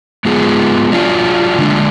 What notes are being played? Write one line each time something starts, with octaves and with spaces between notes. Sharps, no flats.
G#3 B3 F4 G#4
F#3 D4 F4
D3 G#3 D4